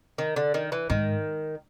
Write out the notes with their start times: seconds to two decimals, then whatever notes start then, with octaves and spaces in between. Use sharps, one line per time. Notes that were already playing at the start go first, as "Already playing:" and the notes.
0.18 D#3
0.36 D3
0.54 D#3
0.72 E3
0.90 G#2 D#3